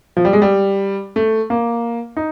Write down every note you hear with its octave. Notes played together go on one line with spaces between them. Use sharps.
F3
G3
G#3
G3
A3
A#3
D#4